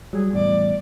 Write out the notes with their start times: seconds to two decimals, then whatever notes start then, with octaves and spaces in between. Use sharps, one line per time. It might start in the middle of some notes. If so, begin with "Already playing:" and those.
0.13 F#3 G3 G#4
0.33 E2 A2 D5